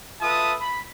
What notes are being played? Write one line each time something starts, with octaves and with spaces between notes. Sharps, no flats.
F4 A4 B4 E5 A5 D#6
B5